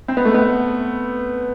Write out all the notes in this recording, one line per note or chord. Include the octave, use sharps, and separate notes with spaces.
C4
B3
A3
B3